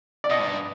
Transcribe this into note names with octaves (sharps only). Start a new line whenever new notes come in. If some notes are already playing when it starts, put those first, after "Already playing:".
D5
B2 D#5
G#2
G2